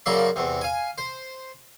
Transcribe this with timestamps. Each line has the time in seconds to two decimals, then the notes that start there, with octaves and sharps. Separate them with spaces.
0.06 F#2 C#3 A#3 D5 E5 C6
0.36 E2 C3
0.61 F5 G#5
0.98 C5